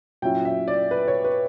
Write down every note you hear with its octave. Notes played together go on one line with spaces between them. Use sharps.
A#2 F#3 C#4 E4 G5
E5
D5
B4
C#5
B4